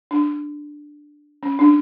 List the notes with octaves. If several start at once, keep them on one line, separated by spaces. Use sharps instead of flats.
D4
C#4
D4